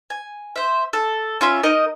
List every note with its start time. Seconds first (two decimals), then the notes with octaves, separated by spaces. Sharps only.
0.10 G#5
0.56 C5 E5
0.93 A4
1.41 C#4 F4 E5 B5
1.63 D#4 A#4 D#5